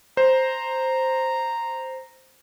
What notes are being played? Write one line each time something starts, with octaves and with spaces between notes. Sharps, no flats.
C5 A#5